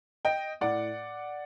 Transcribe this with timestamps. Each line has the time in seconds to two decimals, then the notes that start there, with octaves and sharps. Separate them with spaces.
0.25 D#5 G5
0.61 A2 D5 F#5